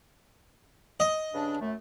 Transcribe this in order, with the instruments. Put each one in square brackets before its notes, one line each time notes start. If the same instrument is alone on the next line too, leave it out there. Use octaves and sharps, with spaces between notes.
[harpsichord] D#5
[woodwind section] G2 C#3 D4
F#2 A3